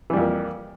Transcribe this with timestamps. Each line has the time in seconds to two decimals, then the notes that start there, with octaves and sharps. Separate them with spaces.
0.10 E3
0.13 G3
0.17 F2
0.20 A#3